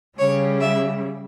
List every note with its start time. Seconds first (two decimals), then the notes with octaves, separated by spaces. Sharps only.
0.18 C#3 G3 C#5
0.60 E5